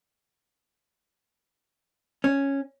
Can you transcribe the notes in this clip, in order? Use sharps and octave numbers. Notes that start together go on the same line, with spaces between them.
C#4